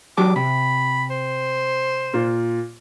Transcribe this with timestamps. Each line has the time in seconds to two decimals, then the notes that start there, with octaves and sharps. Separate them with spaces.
0.18 F#3 G4 A5 D6
0.36 C3 B5
1.11 C5
2.14 A#2 F4